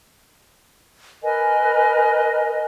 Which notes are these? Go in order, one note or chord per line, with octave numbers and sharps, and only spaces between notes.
A#4 B4 D#5 G#5